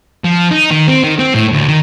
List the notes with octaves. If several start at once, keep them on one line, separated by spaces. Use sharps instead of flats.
F3
D#4
D#3
C4
D#3
C4
A2
D2
D#3